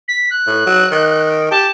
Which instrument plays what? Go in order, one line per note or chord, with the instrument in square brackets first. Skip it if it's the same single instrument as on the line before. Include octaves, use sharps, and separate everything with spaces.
[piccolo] B6
F#6
[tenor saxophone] A2
F#3
D#3
[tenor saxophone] G4 [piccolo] A5